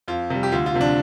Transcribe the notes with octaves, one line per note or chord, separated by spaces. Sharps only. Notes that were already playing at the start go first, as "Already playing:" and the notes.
F2 F4
C3 G3
G4
D2 F4
F4
C3 F3
D4